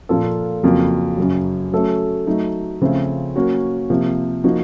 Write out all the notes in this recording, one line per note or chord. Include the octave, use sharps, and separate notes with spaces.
A#2 F3 A#3 F4 A4
F2 C#3 F#3 A#3 F4
F#2 C#3 F#3
F#3 A3 C#4 A4
F#3 A3 D#4
C#3 F3 A3 C4 F4
F#3 A#3 C#4 F#4
C3 F3 A#3
F3 A#3 D#4 F#4